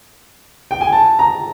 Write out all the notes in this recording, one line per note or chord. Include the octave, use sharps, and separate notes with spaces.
G5
G#5
A5
A#5